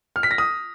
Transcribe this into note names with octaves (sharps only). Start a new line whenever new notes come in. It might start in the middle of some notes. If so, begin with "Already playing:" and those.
F6
B6
A#6
D#6